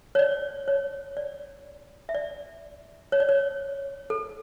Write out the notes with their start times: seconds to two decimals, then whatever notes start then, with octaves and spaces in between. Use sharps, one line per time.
0.15 C#5
0.19 D5
0.68 C#5
1.17 D5
2.09 E5
2.14 D5
3.12 C#5
3.20 D5
3.29 C#5
4.10 A4